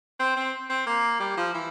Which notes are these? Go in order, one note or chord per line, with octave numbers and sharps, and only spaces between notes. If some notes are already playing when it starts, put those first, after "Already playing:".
C4
C4
C4
A#3
G3
F3
E3